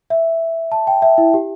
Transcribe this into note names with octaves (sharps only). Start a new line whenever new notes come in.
E5
A5
G5
E5
E4
G4